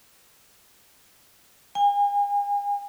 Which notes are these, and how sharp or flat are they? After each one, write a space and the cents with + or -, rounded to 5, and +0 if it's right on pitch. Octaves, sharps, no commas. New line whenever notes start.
G#5 -40